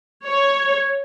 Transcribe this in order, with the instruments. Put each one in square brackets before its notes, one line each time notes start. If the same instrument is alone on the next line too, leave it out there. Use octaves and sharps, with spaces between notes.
[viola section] C#5